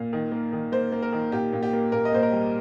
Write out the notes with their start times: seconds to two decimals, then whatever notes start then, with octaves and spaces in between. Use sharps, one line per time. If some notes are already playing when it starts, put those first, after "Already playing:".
Already playing: A#2 F5
0.13 D#3
0.32 A#3
0.53 D#3
0.72 A#3 C5
0.92 A#3
1.02 A#4
1.13 D#3
1.32 A#2 G4
1.53 A#2
1.63 G4
1.73 A#3
1.92 A#2 A#4
2.05 D#5
2.12 A#2 C5
2.23 A#4
2.32 G3